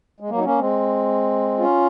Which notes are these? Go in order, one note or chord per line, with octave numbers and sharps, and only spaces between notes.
G#3
F#3 A#3
D#4
A#3 C#4
G#3 C4
C#4 F4